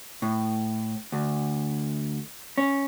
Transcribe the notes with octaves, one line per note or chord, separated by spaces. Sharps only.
A2
D2
C#4